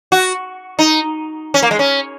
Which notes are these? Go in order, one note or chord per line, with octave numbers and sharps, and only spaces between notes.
F#4
D#4
C#4
A#3
G#3
C#4